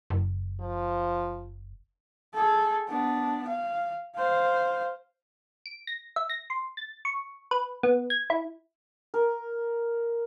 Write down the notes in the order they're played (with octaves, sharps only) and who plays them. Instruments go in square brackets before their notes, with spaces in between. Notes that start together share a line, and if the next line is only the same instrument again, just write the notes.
[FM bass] F#1
[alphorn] F3
[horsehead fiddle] G#4 A4
B3 D4
F5
C5 F5
[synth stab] D7
A#6
E5
A#6
C6
A6
C#6
B4
B3
G#6
E4
[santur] A#4